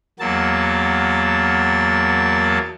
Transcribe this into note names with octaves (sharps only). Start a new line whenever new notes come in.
E2 F#3 A#3 A5